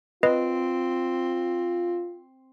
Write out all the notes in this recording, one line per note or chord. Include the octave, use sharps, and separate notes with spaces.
C4 F4 B4 D#5